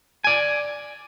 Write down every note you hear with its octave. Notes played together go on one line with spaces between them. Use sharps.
D5 G#5